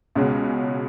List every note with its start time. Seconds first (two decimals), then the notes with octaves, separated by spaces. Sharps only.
0.15 C#2 B2 G#3 C#4 F#4